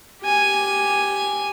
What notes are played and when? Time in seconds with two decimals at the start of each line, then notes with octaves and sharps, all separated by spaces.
0.23 G4 G#5